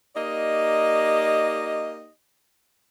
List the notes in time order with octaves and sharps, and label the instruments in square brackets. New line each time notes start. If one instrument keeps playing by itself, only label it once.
[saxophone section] A#3 D#4 G4 D5 D#5